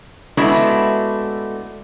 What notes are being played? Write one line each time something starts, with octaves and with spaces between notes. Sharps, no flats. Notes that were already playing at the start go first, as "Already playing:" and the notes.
G#3 A3 B3 D4 E4 F#4